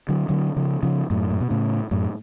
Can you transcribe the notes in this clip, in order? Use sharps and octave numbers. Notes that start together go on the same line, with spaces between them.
D3 F#3
D3 F#3
C#3 F3
C#3 F3
F#2 A2
A2
B2
A2 C#3
F#2 A2